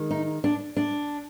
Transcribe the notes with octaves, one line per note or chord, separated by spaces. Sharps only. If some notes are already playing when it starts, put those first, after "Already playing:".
Already playing: D#3 G#3
D#4
D4
D4